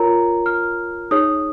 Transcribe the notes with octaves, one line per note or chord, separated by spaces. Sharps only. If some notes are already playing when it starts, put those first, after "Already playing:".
Already playing: F4 A#4 C#5 A#5
F6
D#4 G#4 C#5 D#6